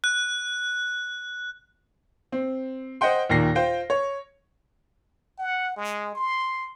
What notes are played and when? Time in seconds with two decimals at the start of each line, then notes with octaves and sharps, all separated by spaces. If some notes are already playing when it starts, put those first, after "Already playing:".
0.04 F#6
2.32 C4
3.01 C5 D#5 F#5 G5 C6
3.30 D#2 A#2 D#3 A#6 C7
3.55 F4 C5 G5
3.90 C#5
5.39 F#5
5.77 G#3
6.15 C6